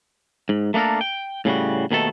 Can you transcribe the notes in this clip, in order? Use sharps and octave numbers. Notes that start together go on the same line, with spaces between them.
G#2
A3 A#3 D4 A4 A#4
G5
A2 C#3 G3 F#4
D#2 B2 D#3 A3 A4